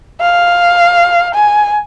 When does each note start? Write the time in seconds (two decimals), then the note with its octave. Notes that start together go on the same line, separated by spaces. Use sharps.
0.21 F5
1.34 G#5